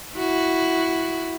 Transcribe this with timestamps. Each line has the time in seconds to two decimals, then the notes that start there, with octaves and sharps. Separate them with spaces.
0.16 E4 F#4